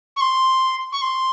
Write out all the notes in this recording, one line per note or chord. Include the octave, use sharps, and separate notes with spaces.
C#6
C6
C#6
C6